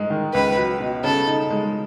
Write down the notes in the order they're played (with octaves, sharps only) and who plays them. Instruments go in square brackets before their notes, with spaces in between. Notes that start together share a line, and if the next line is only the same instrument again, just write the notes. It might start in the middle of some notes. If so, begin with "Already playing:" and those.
Already playing: [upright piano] G#2 G#3
D#3
[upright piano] C#2 [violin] B4
[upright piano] F#3
B2
[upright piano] C#3 [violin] A4
[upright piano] D#4
G#3